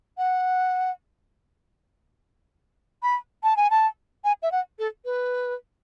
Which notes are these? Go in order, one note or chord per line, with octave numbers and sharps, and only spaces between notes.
F#5
B5
A5
G#5
A5
G#5
E5
F#5
A4
B4